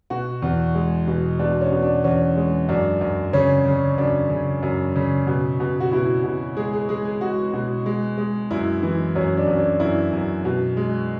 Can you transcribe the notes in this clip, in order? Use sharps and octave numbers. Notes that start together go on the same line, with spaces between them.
B2 F#4
E2
G#3
B2
B2 D4
C#4
B2
D4
E2 C#4
G#3
F#2 D4
F#2
C#3 C#4
C#3
F#2 D4
C#3
F#2
C#3
B2
B2
F#4
B2 E4
B2
G#3 G#4
G#4
G#3 G#4
G#4
G#3 F#4
B2
G#3
G#3
F#2 E4
E3
F#2 C#4
D4
F#2
D4
F#2 E4
F#2
B2
G#3